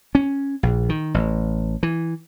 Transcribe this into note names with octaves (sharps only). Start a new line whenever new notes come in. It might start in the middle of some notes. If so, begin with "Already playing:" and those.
C#4
A#1
D#3
A1
E3